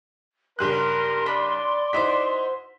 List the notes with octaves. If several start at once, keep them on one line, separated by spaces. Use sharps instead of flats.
F#1 G2 A#4 C6 F#6
D4 D5 B5
D#4 E4 F#4 C5 B6